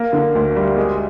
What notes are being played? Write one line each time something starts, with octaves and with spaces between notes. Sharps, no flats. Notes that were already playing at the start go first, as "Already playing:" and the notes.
Already playing: A#3
D3
D2
G3
G#3